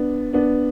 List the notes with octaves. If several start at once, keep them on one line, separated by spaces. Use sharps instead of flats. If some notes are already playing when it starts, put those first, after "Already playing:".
Already playing: B3 D4
B3 D4